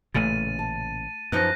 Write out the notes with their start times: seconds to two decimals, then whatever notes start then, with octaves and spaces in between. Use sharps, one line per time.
0.14 A1 A#2 C#3 A3 A6 D#7
0.59 A5
1.32 F#2 F3 D#4 B4 F#6 A#6